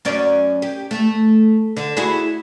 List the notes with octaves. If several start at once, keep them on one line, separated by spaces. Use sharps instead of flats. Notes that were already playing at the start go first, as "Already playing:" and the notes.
F#2 C#4 D5
G4
A3
D3
E4 F#4 G#4